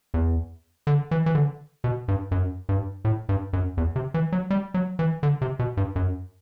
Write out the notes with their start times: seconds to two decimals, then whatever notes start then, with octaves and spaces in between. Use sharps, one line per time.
0.14 E2
0.87 D3
1.11 E3
1.26 E3
1.35 D3
1.84 B2
2.08 G2
2.31 F#2
2.69 G2
3.05 A2
3.29 G2
3.53 F#2
3.77 E2
3.96 C3
4.14 E3
4.32 F#3
4.50 G3
4.74 F#3
4.99 E3
5.23 D3
5.41 C3
5.59 B2
5.77 G2
5.96 F#2